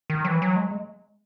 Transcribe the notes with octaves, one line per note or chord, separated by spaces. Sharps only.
D#3
F#3
E3
F#3
G#3